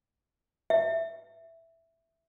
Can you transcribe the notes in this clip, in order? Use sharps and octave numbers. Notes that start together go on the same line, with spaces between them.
E5